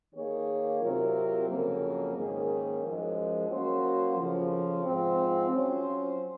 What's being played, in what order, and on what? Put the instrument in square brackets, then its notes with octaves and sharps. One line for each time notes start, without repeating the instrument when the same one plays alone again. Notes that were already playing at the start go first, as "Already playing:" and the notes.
[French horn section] D#3 A#3 D#4 G#4 C#5
C3 F#3 C4 F4 A#4
F2 C#3 F#3 A#3
G#2 D#3 A#3 C#4 G#4
F#2 F3 G#3
F#3 A#3 C#4 F#4 C5
F2 C#3 F3
G#2 F3 C4
F#3 C#4 F4 C5